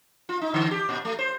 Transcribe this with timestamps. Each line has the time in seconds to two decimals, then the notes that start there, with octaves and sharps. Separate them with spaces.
0.29 F4
0.41 D#4
0.54 D3
0.71 G4
0.89 A#2
1.05 A3
1.19 C5